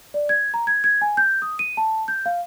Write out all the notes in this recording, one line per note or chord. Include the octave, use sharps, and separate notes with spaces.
D5
G#6
A#5
G#6
G#6
G#5
G6
D#6
D#7
A5
G6
F5